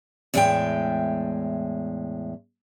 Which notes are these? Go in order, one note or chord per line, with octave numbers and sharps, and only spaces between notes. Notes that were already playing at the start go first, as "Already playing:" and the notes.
E2 A2 G#3 C5 E5 G5